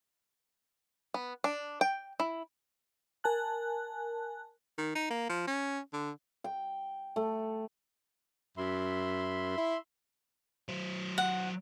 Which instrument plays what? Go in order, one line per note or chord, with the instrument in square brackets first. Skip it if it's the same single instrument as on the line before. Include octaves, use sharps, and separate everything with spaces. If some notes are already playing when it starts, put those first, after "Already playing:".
[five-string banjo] B3
D4
G5
E4
[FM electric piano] A#4 G#5 A5 F#6
[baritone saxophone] D#3
D#4
A#3
F3
C#4
D3
[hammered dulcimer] G5
A3
[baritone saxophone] F#2 [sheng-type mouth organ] E5 B5 C6
[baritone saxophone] E4
[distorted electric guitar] F#3 C5
[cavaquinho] F#5